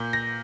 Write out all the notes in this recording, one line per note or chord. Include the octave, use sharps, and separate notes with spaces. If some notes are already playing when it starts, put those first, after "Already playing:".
Already playing: A#2 G6
A#6